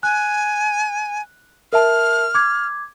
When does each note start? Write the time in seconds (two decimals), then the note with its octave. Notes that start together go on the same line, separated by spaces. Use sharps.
0.03 G#5 F#6
1.73 A#4 E5 A5 F6
2.35 D6 G#6